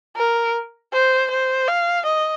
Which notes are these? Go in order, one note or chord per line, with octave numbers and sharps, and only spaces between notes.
A#4
C5
C5
F5
D#5